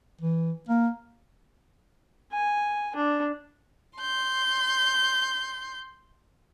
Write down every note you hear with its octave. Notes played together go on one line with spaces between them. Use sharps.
E3
A#3
G#5
D4
C6 G6